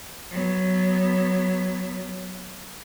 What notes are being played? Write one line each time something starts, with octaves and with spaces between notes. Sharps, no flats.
F#3 B3